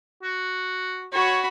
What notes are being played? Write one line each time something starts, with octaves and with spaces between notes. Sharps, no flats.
F#4
F#4 C#5 B5